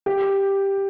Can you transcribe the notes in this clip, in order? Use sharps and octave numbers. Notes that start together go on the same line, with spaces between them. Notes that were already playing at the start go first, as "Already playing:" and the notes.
G4